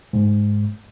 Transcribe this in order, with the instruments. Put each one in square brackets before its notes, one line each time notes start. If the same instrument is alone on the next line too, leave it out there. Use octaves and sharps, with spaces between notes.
[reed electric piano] G#2